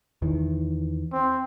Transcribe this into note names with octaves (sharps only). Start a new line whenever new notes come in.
E2 D#3 E3
C4